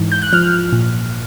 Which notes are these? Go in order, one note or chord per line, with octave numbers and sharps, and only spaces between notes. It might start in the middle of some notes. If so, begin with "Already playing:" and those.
Already playing: G#2 E3
G6
F#6
F3 F6
A#2